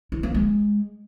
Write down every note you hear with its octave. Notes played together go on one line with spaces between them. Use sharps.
E4
A#3
G#3